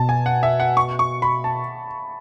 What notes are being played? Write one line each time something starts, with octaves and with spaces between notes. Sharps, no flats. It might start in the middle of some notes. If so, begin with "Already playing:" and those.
Already playing: B2 A5
G#5
F#5
E5
F#5
C#6
C#6
B5
A5